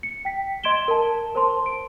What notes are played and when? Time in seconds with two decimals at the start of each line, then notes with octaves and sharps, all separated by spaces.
0.03 C#7
0.25 G5 B6
0.64 D#5 C6 G#6 D7 E7 G7
0.88 A#4 A5
1.35 A#4 C5 A5 C6
1.66 D7